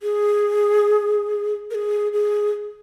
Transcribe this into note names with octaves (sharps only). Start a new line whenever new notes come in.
G#4
A#4
G#4
G#4